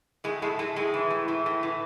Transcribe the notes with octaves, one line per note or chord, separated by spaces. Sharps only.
A2 G#3
A2 G#3
A2 G#3
A2 G#3
E3
A2
E3
A2
E3